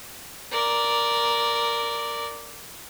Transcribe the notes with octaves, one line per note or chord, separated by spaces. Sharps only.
A#4 D5